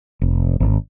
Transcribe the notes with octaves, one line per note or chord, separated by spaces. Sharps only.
F1
G#1